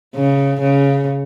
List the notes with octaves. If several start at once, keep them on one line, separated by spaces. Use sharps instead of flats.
C#3
C#3